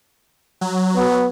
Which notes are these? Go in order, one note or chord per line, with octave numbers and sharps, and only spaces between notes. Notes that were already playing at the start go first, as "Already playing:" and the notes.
F#3
B3